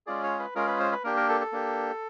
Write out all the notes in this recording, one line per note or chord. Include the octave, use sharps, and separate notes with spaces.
G#3 C#4 F4 G#4 D5
C#5
B4
G#3 C#4 F4 G#4 A#4
B4
C5
B4
A#3 D4 G4 A#4
A#4
A4
A4
A#3 D4 G4